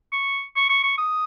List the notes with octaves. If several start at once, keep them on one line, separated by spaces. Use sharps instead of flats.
C#6
C#6
C#6
C#6
D#6